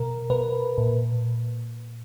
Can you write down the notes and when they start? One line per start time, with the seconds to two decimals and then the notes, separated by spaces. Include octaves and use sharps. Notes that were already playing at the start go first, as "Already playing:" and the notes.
Already playing: B2 A#4
0.30 B2 B4
0.78 A#2